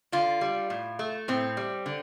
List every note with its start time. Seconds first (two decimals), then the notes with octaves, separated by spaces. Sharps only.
0.12 D3 F4
0.41 G3
0.70 A2
0.99 A3
1.28 A2 C4
1.57 G3
1.86 D3